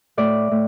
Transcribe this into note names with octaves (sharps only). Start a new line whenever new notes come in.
A2 D5
A2